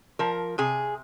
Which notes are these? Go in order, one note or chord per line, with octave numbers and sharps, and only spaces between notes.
F3 A#4
C3 G#4